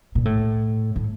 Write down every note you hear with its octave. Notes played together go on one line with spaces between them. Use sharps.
A#2
A2
A2